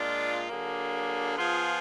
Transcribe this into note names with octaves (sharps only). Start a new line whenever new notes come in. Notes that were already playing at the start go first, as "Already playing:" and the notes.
Already playing: A#2 G#3 D4 F4
D3 F#3 A#3 D4 G#4
F3 B3 F4 G#4